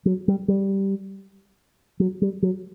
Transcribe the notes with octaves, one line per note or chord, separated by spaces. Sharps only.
F#3
G3
G3
F#3
G3
F#3